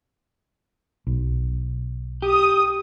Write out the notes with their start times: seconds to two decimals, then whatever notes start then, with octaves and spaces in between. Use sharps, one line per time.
1.07 B1
2.22 G4 D#6